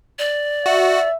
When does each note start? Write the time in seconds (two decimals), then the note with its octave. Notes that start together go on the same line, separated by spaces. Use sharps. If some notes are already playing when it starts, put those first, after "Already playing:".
0.19 D5
0.66 F#4 E5